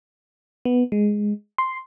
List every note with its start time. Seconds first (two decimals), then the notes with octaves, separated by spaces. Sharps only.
0.65 B3
0.92 G#3
1.58 C6